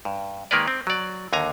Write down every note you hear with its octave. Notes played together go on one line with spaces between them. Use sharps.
G2
D#3 G#3 A#3 A#4 B4 D5
C4
F#3 D5
D#2 D3 G#5 A#5